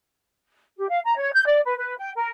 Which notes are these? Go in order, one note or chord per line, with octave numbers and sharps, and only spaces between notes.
G4
F5
A#5
C#5
G6
D5
B4
B4
G5
A#4